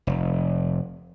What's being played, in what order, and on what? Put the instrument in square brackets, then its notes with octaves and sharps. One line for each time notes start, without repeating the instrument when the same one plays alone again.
[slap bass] F1